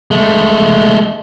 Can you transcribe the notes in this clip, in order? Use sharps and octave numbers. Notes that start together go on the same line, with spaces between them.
G#3 A3